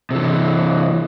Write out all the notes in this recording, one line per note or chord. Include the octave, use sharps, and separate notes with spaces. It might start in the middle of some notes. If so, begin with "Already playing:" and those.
C3 E3